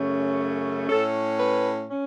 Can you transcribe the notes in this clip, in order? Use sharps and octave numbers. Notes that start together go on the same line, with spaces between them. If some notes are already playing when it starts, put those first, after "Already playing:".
Already playing: F#2 C#3 A3 C#4
A2 A3 C#4 A4
B4
C#4